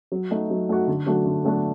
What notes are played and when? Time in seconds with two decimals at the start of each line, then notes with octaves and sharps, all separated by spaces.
0.12 F#3
0.31 A3 D#4 F#4
0.50 F#3
0.69 A3 D#4 F#4
0.88 D3
1.07 F#3 A3 D4 F#4
1.26 D3
1.45 F#3 A3 D4 F#4